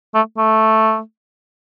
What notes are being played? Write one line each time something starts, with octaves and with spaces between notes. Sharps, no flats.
A3
A3